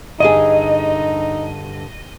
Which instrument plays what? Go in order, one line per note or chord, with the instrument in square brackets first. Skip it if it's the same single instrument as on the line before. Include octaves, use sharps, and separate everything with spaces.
[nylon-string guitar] G2 D3 G#4 [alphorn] D#4 [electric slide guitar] D#5